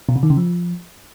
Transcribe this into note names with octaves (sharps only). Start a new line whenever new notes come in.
B2
C3
D#3
C#3
F3